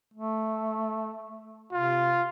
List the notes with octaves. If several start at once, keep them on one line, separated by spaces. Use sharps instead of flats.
A3
C3 F4